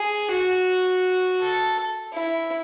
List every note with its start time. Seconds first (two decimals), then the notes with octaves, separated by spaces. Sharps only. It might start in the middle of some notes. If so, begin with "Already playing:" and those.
Already playing: G#4
0.31 F#4
1.40 A4
2.14 E4